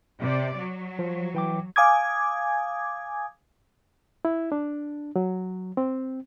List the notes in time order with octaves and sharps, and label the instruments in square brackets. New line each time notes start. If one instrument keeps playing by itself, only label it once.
[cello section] C3 D5
F#3
[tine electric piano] F3
E3 G5 D6
[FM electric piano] F5 G#5 D6 D#6 G#6
[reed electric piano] E4
D4
F#3
C4